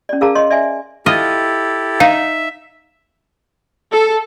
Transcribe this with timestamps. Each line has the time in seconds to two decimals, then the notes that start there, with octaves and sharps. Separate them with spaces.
0.09 C#4 D5
0.21 G#4 A#4 F5 A5 A#5
0.35 C#5 D#5 C6
0.50 D5 E5 G#5
1.06 E4 F4 G4 A4 D#5
2.00 D#4 E5 F5
3.91 A4